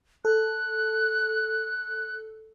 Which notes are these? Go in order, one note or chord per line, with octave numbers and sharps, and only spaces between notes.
A4 F#6